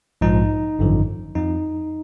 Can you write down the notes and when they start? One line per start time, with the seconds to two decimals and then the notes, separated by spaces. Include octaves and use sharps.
0.21 A#1 G#2 F3 D#4
0.79 G#1 F#2 D3 F3
1.35 F2 F3 D#4